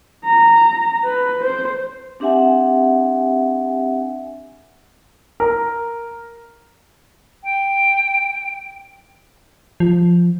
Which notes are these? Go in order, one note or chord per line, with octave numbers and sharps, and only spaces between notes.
A#5
B4
C5
C4 D4 G4 E5 F#5 G#5
A#4
G5
F3